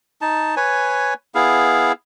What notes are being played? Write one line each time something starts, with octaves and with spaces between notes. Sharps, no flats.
D#4 A5
B4 C#5 G#5
B3 E4 G#4 F5